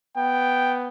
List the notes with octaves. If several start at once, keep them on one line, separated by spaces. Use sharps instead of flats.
B3 G5